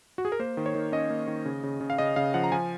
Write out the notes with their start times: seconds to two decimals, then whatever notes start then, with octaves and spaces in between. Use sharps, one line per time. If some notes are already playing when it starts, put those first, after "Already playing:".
0.18 F#4
0.25 G#4
0.32 A#4
0.39 A#3 C5
0.57 D#3
0.66 C#5
0.75 D#3
0.92 C#4 D#5
1.10 A#3
1.27 D#3
1.45 C#3
1.63 C#3
1.81 C#3
1.90 F5
1.98 C#3 D#5
2.16 C#3 F5
2.34 F3 F#5
2.44 A#5
2.52 F3 G#5